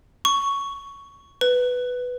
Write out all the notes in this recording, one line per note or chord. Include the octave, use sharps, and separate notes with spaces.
C#6
B4